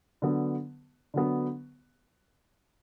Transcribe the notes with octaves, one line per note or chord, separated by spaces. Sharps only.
D3 F#3 B3
D3 F#3 B3